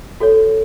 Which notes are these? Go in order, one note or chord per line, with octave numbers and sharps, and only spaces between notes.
F#4 A4 C#5